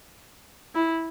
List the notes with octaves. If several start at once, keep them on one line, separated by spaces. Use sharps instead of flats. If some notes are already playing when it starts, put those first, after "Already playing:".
E4